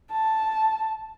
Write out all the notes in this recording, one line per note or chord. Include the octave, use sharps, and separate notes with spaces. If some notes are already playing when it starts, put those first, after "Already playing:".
A5